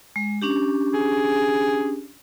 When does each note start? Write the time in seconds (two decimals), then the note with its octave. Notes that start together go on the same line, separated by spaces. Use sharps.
0.16 G#3
0.42 C#4 D4 G4
0.93 G#4